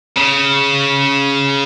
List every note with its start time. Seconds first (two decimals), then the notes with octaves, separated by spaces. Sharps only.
0.17 C#3